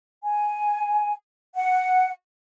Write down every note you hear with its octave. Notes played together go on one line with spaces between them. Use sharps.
G#5
F#5